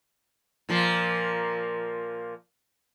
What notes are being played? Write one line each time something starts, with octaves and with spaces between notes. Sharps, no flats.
A#2 F3 A#3